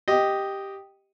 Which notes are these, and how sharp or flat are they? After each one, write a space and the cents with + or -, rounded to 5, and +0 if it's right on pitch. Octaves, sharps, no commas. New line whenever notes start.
G4 +0 D#5 +0